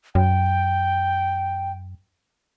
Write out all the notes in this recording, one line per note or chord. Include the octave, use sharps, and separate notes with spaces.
F#2 G5